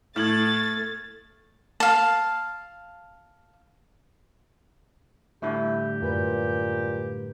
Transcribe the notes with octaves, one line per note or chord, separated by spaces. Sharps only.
A2 A3 F6 G#6 A6 F#7
F5 A5
A2 D3 G3 E4 G4
F#2 A#2 B4 G6